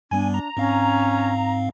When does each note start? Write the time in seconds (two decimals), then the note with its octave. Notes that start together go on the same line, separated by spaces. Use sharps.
0.11 G2 G3 B3 D4 G#5
0.34 A#5
0.57 G#2 C4 C#4 F5